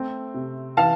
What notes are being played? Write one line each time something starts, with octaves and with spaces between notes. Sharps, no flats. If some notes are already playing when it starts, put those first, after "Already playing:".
Already playing: A3 C4
C3
E3 F5 A5